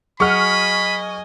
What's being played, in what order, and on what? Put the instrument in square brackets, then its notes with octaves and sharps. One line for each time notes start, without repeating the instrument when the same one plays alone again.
[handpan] F#3 G#4 F#5 [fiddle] D#5 G#5 [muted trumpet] B5 [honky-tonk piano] C#6 F6